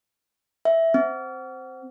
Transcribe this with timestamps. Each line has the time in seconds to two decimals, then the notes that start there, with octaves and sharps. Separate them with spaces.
0.65 E5
0.94 C4